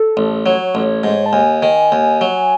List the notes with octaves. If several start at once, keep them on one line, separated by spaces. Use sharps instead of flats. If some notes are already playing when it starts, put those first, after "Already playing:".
Already playing: A4
A1
F#3 C#5
A1
G#2
A5
D#2 G#5
D#3
D#2
F#3